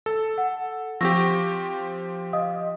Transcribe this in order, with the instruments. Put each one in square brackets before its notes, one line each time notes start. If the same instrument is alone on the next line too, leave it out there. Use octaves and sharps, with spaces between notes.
[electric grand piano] A4
[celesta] F#5
[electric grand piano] F3 C4 G4 [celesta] C#6 E6 A#6
[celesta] D#5 F5 D#6